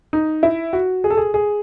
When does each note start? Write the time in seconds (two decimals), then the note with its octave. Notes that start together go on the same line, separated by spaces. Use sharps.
0.13 D#4
0.43 E4
0.73 F#4
1.04 G#4
1.10 A4
1.17 G#4
1.34 G#4